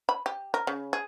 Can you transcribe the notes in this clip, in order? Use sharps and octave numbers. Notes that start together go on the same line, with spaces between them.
B5
G4
A#4
C#3
G#4